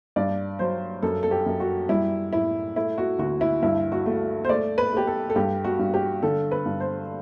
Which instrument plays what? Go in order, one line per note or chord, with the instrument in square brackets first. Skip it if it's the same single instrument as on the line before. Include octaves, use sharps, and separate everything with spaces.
[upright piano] G2 D5
F#3 C5
F#2 A4
A4
G4
F#2
F#4
G3 E4
A2 E4
A3 E4
F#4
D2 F#4
E4
G2 E4
F#4
A3
C5
A3 D5
B4
A3 G4
A4
A4
G2 G4
F#4
G2
G4
D3 A4
B4
G2
C5